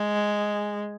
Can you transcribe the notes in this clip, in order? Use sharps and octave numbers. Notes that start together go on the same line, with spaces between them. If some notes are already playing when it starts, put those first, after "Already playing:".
Already playing: G#3